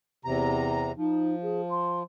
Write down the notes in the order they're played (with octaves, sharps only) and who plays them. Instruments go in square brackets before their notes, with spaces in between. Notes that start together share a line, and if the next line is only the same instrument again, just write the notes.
[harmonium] E2 C3 A#5
[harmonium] F3 [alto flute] D#4
[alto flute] G#4
C6